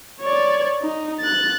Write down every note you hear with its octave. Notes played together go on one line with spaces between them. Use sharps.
C#5 D5
D#4
F#6 A6